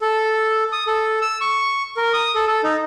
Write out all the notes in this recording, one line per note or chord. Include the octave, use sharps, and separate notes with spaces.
A4
D#6
A4
E6
C#6
A#4
D#6
A4
A4
D#4